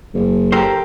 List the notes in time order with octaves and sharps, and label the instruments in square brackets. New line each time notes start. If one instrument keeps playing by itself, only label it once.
[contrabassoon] F#1
[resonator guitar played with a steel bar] G4 [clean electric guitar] A4 A#4 C5